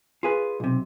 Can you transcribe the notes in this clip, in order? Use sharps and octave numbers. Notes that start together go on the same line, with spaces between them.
F4 G#4 B4
B1 C3